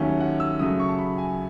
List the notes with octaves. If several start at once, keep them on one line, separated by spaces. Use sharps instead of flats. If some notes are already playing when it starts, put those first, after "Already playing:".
Already playing: D#2 D#3 F#3 A3 C#4
F#5
E6
F#2 C#3 F#3 A3 D#6
C#6
A5
B5
G#5